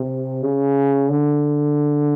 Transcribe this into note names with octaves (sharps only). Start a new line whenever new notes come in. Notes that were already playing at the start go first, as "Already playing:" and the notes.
Already playing: C3
C#3
D3